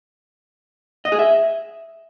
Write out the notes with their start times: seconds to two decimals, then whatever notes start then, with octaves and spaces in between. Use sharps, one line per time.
1.05 D#5
1.12 G#4
1.19 E5